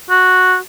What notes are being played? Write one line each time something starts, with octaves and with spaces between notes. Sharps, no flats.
F#4